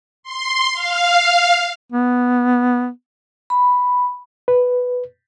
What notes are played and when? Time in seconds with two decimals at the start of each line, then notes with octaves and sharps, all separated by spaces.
0.23 C6
0.73 F5
1.92 B3
3.50 B5
4.48 B4